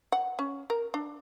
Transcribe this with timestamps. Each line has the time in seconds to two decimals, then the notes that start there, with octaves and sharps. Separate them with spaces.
0.12 F#5
0.39 C#4
0.70 A#4
0.94 D4